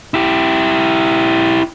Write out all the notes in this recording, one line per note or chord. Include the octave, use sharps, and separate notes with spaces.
E4 G4